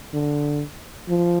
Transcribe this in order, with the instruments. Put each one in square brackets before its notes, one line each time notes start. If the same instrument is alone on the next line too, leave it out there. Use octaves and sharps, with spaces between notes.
[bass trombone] D3
F3